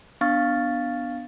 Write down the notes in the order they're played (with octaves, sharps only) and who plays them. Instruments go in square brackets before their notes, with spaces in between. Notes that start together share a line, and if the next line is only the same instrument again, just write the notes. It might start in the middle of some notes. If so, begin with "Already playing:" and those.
[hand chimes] B3 D4 F5 C#6 F6 A6